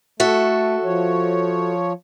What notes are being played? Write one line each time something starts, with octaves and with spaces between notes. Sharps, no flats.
A3 F#4 A4 E5
F3 C#5